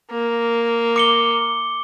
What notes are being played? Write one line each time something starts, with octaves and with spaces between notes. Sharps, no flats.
A#3
D6 C#7 G7